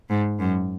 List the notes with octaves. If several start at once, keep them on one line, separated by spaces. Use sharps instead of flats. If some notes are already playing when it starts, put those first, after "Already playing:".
G#2
F#2